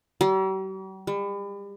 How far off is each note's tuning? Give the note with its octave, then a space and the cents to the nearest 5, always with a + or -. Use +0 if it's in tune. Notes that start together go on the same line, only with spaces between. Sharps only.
G3 -45
G3 +40